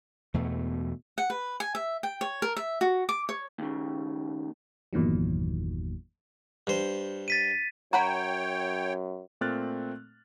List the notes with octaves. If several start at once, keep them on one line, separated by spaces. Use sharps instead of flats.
E2 B2 A3
F#5
B4
G#5
E5
G5
C#5
A#4
E5
F#4
D6
C#5
D#2 C#3
G1 E2 A#2 D#3 F#3
G2 C5
A6 B6 D#7
F#2 F#4 C#5 F#5 G5 A#5 B5
A#2 A3 C4 F6 F#6 A6